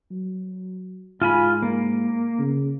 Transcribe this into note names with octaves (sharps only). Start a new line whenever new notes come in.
F#3
G#2 F4 G#5 B5
A#3
C#3